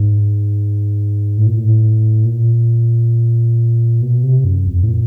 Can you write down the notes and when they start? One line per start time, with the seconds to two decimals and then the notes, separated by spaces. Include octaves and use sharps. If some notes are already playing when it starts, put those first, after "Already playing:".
Already playing: G#2
1.38 A2
1.46 A#2
1.56 A2
2.25 A#2
4.02 B2
4.23 C3
4.44 F#2
4.67 F2
4.83 A2
4.88 A#2